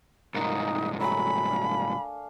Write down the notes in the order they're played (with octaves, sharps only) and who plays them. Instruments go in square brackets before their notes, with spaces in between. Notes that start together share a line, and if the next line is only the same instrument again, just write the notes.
[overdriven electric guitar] C2 G#2 [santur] A#3 [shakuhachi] D#4
[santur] F#3 A3 G#5 [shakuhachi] B5
[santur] D4 F5